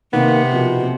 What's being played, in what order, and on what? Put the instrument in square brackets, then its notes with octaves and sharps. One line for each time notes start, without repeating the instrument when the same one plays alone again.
[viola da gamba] C3 [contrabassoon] D#3 [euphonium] A#3 [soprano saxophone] B3
[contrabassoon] F2 [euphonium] B2